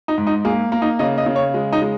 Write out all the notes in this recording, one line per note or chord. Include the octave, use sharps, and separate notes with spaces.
D#4
G#2
D#4
A#3 G#4
A#3
D#4
C#3 D#5
D#5
C#3
C#5
G#3
D#4
G#3